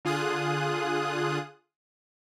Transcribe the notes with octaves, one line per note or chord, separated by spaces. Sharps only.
D3 F4 G#4 D#6 F#6